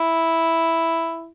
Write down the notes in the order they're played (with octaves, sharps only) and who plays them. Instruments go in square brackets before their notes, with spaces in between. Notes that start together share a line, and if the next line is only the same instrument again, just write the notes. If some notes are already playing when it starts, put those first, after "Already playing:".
Already playing: [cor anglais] E4